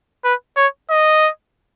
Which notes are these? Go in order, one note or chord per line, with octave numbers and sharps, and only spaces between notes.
B4
C#5
D#5